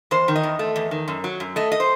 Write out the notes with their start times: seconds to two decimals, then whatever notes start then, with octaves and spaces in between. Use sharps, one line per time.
0.11 E2 C5
0.28 D#3
0.36 D#5
0.43 E2
0.59 A3
0.76 E2
0.91 D#3
1.08 F#2
1.24 F#3
1.40 F#2
1.56 A3 D#5
1.72 D#5
1.80 C5